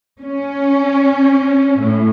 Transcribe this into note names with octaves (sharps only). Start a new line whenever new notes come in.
C#4
A2